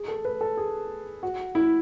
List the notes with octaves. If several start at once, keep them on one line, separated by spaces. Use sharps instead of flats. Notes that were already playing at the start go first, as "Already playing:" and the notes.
Already playing: G#4
A4
B4
A4
G#4
F#4
E4